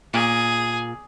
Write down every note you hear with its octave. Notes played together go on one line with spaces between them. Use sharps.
A#2 G#4